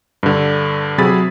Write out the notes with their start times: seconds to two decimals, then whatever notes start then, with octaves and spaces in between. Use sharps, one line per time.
0.23 G2 D3
0.98 C3 F#3 G#4 B5 A6 B6